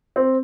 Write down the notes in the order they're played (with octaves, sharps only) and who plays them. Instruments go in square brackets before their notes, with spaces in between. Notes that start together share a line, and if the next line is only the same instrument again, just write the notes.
[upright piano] C4